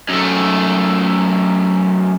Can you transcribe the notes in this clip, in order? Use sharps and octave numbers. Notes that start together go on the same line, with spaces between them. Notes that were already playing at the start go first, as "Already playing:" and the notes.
F#2 A3